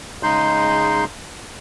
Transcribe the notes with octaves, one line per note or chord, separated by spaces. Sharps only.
C#3 G#3 D#4 C6 G6